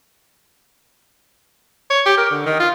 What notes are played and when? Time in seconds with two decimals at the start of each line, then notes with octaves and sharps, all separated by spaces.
1.90 C#5
2.06 G4
2.17 A#4
2.30 D3
2.46 D#3
2.60 F4